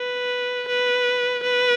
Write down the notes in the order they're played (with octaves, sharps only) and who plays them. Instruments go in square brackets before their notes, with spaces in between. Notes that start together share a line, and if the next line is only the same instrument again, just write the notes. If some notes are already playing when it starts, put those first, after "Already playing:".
Already playing: [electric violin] B4
B4
B4